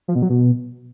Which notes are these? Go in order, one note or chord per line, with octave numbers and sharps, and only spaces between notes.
F3
B2
F#3
B2